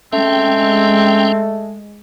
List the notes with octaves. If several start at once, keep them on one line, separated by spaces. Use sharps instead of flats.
G#3 A3 C4 C#4 G5